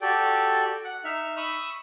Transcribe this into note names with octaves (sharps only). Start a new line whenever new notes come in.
F#4 G4 A4 D5 G5
F#5 F#6
D#4 E5 F6
B5 C#6 D#6 E6